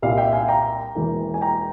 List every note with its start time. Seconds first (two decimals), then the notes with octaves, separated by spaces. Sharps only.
0.02 C2 A#2 G3 F5
0.18 E5 G5
0.33 F5 G#5
0.48 G5 A#5
0.95 E1 E2 E3 A#3
1.34 G#5
1.41 G5 A#5